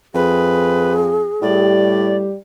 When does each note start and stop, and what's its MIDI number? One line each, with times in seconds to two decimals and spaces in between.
0.14 1.30 41
0.14 1.69 68
0.14 0.93 71
1.42 2.28 45
1.42 2.34 55
1.42 2.34 67
1.42 2.16 74